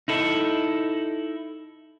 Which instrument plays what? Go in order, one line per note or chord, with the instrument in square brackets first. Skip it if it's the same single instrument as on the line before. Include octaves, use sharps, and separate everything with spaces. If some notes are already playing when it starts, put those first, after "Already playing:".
[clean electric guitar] D#4 E4 A4